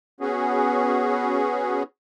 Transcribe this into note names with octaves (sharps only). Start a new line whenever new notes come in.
B3 C#4 F#4 G#4